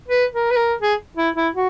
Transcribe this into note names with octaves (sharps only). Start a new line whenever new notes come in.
B4
A#4
B4
A#4
G#4
E4
E4
F#4